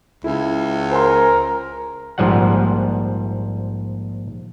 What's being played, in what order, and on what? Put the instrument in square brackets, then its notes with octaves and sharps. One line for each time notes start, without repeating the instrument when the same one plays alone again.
[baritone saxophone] C#2 [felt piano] E4
[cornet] A#4 [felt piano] C5 G#5 C6
[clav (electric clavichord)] A#1 G#2 F3 G3 F#5